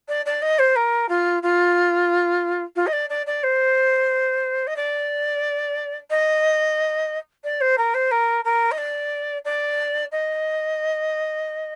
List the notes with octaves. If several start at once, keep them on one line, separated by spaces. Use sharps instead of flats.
D5
D5
D#5
C5
A#4
F4
F4
F4
D#5
D5
D5
D5
C5
D#5
D5
D#5
D5
C5
A#4
C5
A#4
A#4
D#5
D5
D5
D#5